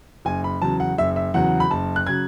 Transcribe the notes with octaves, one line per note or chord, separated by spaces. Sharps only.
F#1 G#5
B5
E2 C#3 F#3 A5
F#5
F#1 E5
E5
E2 C#3 F#3 F#5
B5
F#1 A5
F#6
C#3 F#3 G#6